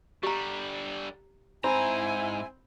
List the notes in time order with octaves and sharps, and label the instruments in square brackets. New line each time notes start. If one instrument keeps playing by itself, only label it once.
[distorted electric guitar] D3 G3 [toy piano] G4 A#5
[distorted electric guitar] G#2 A#5 [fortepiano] C4 [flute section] E4 G#5 [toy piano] B5